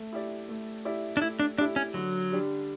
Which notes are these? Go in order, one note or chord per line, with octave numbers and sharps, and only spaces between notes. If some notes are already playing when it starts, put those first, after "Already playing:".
Already playing: A3
E4 G4 D5
A3
E4 G4 D5
D4
A3 E4
D4
D4 E4 G4 D5
C#4
D3 F#3
G3 D4 G4